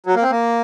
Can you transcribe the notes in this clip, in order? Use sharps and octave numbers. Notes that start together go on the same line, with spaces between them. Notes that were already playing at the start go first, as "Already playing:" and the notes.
F#3
A#3
C4
A#3